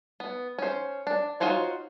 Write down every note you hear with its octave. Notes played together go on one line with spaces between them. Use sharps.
B3
C#4 C5
D4
D#4 F4 F#4 C5 C#5